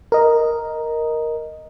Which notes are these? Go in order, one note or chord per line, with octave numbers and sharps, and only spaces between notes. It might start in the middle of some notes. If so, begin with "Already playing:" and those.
A#4 D#5